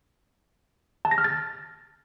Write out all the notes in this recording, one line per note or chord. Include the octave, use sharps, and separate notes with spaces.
A5
A#6
F6
A6